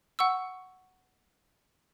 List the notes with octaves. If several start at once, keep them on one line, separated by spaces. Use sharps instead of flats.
F#5 C#6 E6